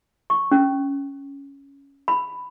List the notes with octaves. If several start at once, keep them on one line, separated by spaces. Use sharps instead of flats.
C#6
C#4
B5